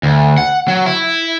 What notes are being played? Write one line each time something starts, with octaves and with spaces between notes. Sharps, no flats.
D2
F#5
F#3
E4